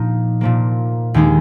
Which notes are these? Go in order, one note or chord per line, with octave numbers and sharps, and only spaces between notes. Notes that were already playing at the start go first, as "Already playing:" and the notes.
Already playing: A#2 F3 A#3 D#4
A#2 F3 A#3
D#2 D#3 G#3 D#4